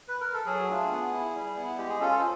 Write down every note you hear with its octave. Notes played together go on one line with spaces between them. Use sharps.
B4
A#4
A4
F#3 G#4
A3 D4 F4
B3
E4
G3
B3 E4
G#3 G4
G#4
C#4 F4 A4
A4
C5